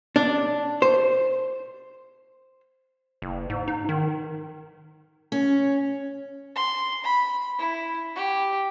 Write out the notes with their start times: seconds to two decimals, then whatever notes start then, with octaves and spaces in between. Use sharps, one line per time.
0.16 D4
0.82 C5
3.22 F#1
3.50 G#2
3.68 D#4
3.89 D#3
5.32 C#4
6.56 C6
7.04 B5
7.58 E4
8.15 G4